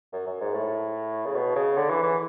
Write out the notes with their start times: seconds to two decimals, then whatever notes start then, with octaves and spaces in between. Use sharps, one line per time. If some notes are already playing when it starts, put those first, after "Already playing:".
0.13 F#2
0.27 F#2
0.41 G#2
0.54 A2
1.26 C#3
1.35 B2
1.56 C#3
1.77 D3
1.90 E3
2.03 E3